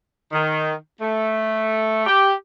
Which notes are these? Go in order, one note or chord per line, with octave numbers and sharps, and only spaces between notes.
D#3
A3
G4